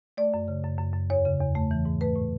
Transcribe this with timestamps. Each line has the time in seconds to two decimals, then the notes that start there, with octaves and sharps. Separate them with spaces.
0.17 A3 D5
0.34 F#2
0.48 C#3
0.63 F#2
0.79 F#2
0.94 F#2
1.10 E2 C#5
1.25 C#3
1.41 E2
1.55 A3
1.71 E3
1.85 G#2
2.01 A3 B4
2.16 A2